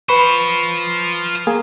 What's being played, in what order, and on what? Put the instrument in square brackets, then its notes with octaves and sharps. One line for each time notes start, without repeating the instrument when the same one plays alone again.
[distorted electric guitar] F4 C5 [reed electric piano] B4 B5 C#6
[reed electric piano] A#3 G#4